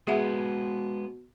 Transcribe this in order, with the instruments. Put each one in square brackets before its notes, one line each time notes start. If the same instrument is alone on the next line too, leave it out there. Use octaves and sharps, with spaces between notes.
[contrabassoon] B2 [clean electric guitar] G#3 B3 C5 [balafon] G#4 E5 F#5